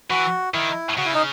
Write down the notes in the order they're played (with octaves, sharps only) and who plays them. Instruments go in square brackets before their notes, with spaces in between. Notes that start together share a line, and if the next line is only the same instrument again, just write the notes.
[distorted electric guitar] E3 [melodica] F#4
[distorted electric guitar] D#3 [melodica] E4
[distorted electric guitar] C#3 [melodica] F#4
[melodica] E4
D#4